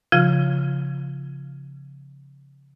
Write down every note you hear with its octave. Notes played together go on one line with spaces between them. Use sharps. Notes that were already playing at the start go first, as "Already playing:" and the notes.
C#3 F3 F4